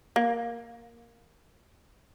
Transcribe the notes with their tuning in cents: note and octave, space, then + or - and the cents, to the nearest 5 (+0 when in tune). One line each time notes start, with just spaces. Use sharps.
A#3 +0